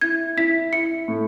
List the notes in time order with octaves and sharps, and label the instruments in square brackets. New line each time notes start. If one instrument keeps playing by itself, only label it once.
[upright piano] E4 [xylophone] G#6
[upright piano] E4 [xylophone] B6
[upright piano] E4 [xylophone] C#7
[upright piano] A2